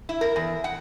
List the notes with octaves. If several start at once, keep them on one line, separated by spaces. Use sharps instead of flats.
E4
A#4
E2
F#5